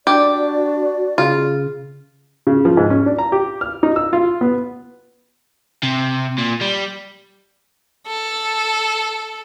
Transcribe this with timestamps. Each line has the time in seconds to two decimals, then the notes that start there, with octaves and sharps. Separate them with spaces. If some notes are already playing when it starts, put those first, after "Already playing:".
0.07 D4 F#4 G4 D5
1.18 C#3 F4
2.47 C#3
2.65 F3
2.77 G#2
2.90 C#4
3.06 D4
3.19 A#5
3.32 G4
3.61 F6
3.83 D#4
3.96 E6
4.13 F4
4.41 B3
5.83 C3
6.39 A#2
6.61 G3
8.07 A4